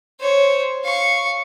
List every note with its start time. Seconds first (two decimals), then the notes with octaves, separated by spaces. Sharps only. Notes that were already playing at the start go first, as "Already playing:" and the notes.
0.20 C5 C#5
0.84 F5 C#6